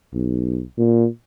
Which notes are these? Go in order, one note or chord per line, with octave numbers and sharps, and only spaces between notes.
B1
A#2